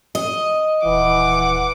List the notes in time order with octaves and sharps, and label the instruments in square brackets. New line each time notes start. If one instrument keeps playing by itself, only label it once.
[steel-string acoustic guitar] D#5
[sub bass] D#1 [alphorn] E3 [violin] F#5 D6